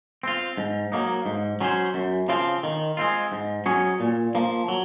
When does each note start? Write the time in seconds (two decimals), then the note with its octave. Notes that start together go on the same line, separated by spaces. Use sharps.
0.23 C4 F4
0.57 G#2
0.92 F#3 A#3 D#4
1.26 G#2
1.61 F#3 C#4 G#4 C5
1.94 F#2
2.28 C#3 F3 C4 F4
2.63 D#3
2.97 G#3 C4 F4
3.32 G#2
3.66 F#3 C#4 G#4 C#5
4.00 A#2
4.35 F3 A#3
4.68 F#3